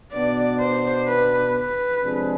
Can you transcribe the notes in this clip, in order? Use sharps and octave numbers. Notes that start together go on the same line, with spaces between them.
B2 B3 D4 D5
C5
B4
B4
C3 F3 G#3 D4 G#4